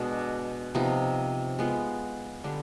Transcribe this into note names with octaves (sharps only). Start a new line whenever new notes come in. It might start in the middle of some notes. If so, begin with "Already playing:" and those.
Already playing: B2 G#3 D4
C3 F3 B3 D#4
G#3 B3 F4
D3 G3 D4 G4